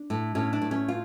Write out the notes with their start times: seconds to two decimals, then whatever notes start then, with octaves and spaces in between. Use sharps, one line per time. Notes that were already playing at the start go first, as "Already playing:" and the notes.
Already playing: D4
0.10 A2
0.35 A2 C#4
0.53 D4
0.62 A2
0.71 C#4
0.88 F4